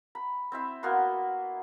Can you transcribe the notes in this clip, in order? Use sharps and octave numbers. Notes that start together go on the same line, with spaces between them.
B5
C4 E4 E5
A#3 B3 F#4 C6